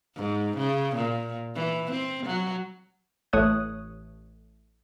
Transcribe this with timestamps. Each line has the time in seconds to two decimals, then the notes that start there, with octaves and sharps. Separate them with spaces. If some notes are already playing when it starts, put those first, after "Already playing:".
0.16 G#2
0.57 C#3
0.96 A#2
1.55 E3
1.91 C4
2.26 F#3
3.33 A1 A3 C#5 D#6 F#6